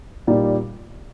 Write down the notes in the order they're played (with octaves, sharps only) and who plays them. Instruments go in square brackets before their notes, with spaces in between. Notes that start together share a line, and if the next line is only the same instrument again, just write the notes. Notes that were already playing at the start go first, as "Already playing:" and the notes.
[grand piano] A#2 G3 A#3 D#4